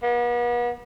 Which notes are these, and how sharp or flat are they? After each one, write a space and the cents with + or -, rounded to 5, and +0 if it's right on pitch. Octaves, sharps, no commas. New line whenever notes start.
B3 -40